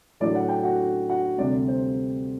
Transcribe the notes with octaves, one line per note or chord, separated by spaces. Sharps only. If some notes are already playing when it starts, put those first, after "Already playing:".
A2 F#3 A3 D4 D5
F#5
G5
F#4 F#5
F#4 F#5
D2 C3 G3 D5
C5